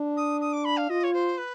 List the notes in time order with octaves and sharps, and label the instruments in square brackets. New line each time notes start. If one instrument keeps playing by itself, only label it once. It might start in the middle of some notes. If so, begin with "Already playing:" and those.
Already playing: [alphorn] D4
[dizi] D#6
D#6
D6
B5
F5
[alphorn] F4 [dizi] D#5
[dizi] C#5
C5
B4